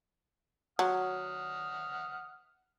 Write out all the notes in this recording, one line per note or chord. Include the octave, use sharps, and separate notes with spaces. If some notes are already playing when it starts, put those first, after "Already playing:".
F#3 F#5 D#6 F6